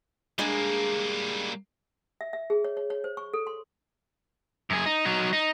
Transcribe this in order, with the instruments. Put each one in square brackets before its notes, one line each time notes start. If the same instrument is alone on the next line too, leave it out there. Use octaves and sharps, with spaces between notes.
[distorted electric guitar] G3 A#3 [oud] G#3 D4 G#4
[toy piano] E5
E5
G#4
C#5
C#5
C#5
C5
C#6
A4
C6
[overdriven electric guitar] F#2 G#4
D#4
F#3 D#4
D#4